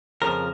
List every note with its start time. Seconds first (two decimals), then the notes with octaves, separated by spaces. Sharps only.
0.22 F2 C#3 F3 A#4